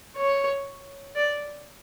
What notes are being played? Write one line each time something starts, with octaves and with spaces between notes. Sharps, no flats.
C#5
D5